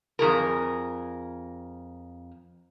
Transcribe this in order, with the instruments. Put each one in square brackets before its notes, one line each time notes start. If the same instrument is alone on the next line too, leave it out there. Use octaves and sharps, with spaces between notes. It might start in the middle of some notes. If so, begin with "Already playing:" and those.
[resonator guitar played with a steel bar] F2 E3 G#4 A#4